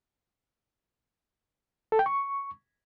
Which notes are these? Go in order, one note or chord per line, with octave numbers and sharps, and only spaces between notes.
A4
G5
C#6